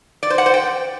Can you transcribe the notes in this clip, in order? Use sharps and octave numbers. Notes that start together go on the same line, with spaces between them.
D5
C5
F#5
C5
G5